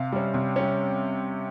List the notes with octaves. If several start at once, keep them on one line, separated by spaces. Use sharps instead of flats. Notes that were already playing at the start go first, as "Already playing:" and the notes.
Already playing: C3 F5
G3 C#4
C3
G3 C#4